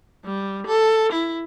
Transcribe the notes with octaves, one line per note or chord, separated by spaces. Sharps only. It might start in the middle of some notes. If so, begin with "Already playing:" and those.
G3
A4
E4